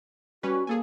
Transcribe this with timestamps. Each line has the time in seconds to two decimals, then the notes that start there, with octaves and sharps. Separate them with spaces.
0.43 G3 C#4 F#4 B4
0.67 A#3 G#4 A4 G#5